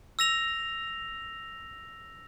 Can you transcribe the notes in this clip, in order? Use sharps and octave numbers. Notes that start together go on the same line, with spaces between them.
E6 A#6 F7